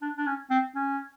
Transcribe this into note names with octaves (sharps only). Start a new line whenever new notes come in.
D4
D4
C#4
C4
C#4